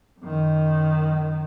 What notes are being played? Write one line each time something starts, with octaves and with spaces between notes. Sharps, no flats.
F#2 D#3